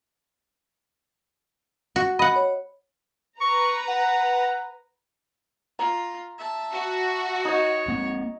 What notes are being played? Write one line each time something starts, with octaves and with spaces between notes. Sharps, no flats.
F#4
D#5 F#5 B5
C#5
B4 A#5 C#6
F#5
F4 A#5
E5 A5
F#4
D#4 C#5 D#5
A#3 C4